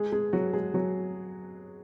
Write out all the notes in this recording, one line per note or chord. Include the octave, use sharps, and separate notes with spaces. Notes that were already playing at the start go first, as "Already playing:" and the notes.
Already playing: G#3 G#4
G#3 G#4
F#3 F#4
G#3 G#4
F#3 F#4